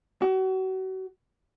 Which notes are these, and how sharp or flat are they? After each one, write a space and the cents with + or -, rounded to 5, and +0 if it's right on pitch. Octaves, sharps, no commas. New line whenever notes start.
F#4 +35